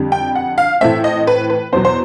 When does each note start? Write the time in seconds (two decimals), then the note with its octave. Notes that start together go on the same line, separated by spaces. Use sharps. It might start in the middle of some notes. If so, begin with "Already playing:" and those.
Already playing: F2 D3 G3
0.12 G5
0.35 F#5
0.58 F5
0.81 A2 E3 A3 C4 E5
1.04 D#5
1.27 B4
1.50 B4
1.72 E2 B2 F#3 B3 C5
1.85 C5